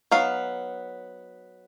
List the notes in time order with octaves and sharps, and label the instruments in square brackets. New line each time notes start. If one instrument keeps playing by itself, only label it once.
[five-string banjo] F#3 B3 D#4 F5